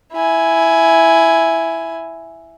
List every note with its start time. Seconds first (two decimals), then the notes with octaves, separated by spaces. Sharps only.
0.13 E4 G#5